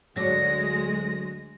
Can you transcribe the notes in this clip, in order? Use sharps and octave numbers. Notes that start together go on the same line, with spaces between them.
D2 F#3 G#3 D4 A#6